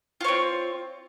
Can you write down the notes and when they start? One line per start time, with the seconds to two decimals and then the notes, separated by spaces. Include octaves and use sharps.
0.21 F4
0.24 C#5
0.28 C4